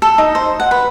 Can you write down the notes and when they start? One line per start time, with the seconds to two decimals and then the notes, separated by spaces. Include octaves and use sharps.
0.02 A4
0.18 D#4
0.35 C5
0.60 F#5
0.71 B4